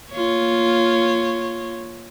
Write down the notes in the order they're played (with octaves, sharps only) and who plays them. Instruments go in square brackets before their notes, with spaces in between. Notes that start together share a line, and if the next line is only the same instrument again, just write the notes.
[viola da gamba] A#3 F4 C#5